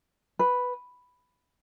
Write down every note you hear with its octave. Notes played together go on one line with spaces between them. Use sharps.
B4